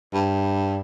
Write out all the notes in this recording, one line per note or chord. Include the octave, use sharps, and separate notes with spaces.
G2